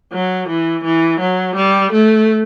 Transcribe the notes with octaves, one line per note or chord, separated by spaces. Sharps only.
F#3
E3
E3
F#3
G3
A3